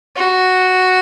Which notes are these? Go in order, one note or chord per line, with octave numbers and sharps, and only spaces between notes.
F#4